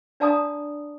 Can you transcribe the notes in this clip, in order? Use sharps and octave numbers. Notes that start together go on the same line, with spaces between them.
D4 D5 F5 A5 A#5 D#6